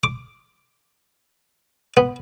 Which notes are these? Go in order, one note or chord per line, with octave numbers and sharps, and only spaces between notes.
D6
B3